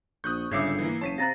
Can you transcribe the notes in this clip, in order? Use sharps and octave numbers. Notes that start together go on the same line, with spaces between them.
A#1 C#6 D#6 F#6 G6
G1 G#2 C#3 E5 D6 G#6 C7 C#7
E3 A#3
F#1 C#5 A5 B6 D#7
C3 F5 A#5 F#6 A6 A#6